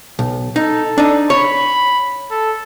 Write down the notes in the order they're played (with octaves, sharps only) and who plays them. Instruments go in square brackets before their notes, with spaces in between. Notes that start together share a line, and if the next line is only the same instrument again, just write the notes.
[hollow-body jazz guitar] B1
[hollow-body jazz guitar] D#4 [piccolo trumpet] A4
[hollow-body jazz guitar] D4 D#4
[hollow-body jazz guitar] C#5 [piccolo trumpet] B5
[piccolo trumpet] A4